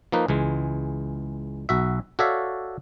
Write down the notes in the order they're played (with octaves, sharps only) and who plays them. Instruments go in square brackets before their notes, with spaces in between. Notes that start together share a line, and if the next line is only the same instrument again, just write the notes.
[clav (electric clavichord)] F3 A#3 D#4 B4
C#2 E3 G#3
B1 F#4 E5
F#4 A4 C#5 D5 E5 F5